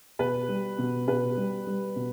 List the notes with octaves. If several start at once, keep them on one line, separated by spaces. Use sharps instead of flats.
B2 B4
G3
B2
B2 B4
G3
G3
B2